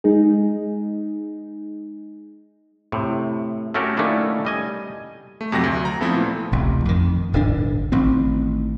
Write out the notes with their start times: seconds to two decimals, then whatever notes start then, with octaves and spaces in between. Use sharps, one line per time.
0.04 G#3 D#4 G#4
2.92 A2 C3
3.74 A3 C#4 F#4 G4 A4 A#4
3.97 D#3 A3 A#3 C#4 D4 E4
4.45 G3 D#5 G#5
5.41 A3
5.52 F2 C3 F#3 F#4 A4 A#6
5.64 D2
5.85 A#5
6.01 F3 A3 B3 C4 E4 A4
6.14 A#2
6.52 D1 A1 C3
6.85 F2 D#3
7.33 D#1 G#1 D3 D4
7.92 A1 D#3 C4